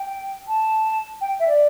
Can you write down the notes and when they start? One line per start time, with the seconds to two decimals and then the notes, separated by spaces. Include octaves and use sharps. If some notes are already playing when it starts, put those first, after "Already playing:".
Already playing: G5
0.48 A5
1.21 G5
1.40 E5
1.48 D5